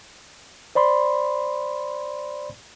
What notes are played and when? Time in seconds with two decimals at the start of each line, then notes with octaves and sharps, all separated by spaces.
0.75 C5 D5 B5 C6